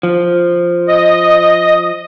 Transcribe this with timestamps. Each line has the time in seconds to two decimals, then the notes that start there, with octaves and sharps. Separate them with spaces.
0.03 F3
0.88 D#5